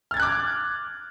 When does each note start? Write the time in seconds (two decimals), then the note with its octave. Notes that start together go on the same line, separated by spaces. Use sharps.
0.11 F6
0.14 A6
0.17 G#6
0.20 F#6
0.22 D6